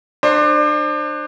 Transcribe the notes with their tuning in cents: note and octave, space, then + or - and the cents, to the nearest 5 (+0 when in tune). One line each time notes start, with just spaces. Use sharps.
D4 +30 C5 +20